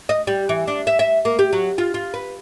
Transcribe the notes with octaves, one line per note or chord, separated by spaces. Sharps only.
D#5
G3
E3
D4
E5
E5
A#3
G4
F#3
F4
F4
B4